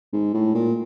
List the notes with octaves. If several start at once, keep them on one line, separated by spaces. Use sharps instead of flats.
G#2
A2
A#2